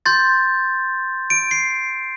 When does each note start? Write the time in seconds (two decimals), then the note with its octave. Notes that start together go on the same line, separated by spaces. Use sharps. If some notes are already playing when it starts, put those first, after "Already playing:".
0.06 C6 G6 A6
1.30 D7
1.51 C7